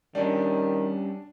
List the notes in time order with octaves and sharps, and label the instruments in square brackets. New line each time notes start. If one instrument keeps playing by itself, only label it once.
[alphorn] D#3 [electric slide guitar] G3 C#4 [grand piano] D4